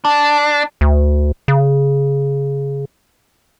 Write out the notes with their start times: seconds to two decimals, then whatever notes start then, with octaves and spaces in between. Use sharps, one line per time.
0.05 D4
0.81 D2
1.48 C#3